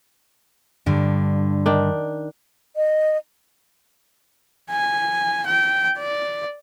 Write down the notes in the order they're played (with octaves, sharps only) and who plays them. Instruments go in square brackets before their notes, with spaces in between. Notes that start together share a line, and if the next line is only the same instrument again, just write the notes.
[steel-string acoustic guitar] G2 D3
[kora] D#3 D4
[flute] D#5
[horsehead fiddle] G#5
G5
D5